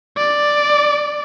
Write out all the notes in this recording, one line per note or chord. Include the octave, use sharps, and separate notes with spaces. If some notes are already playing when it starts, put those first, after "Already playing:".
D5